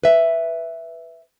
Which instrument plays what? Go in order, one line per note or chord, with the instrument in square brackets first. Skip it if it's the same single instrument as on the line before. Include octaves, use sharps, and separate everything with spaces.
[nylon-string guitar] B4 E5